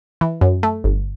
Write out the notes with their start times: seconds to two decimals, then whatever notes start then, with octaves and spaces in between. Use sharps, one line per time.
0.21 E3
0.41 F#2
0.63 A3
0.84 G1